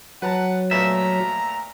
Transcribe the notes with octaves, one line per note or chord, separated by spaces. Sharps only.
F#3 B4 F#5 A5 A#5
A#2 A3 B3 E5 A#5